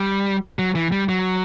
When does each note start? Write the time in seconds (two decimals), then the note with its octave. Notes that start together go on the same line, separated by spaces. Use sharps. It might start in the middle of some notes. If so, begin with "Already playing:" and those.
Already playing: G3
0.59 F#3
0.75 E3
0.92 G3
1.09 F#3